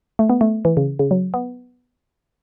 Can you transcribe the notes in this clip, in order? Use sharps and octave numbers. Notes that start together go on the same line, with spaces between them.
A3
B3
A3
E3
C#3
C#3
F#3
B3